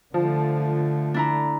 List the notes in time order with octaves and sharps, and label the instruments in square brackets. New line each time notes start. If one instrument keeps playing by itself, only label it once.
[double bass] D3 A3 [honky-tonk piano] F3
[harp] D4 E4 A#5